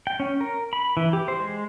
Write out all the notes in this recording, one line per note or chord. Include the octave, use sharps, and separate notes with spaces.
G5
C#4
A#4
B5
E3
G4
C5
G#3